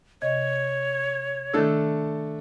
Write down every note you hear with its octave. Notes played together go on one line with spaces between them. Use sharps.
C3 C#5 D#5 G#6
D#3 A3 D4 A4 E6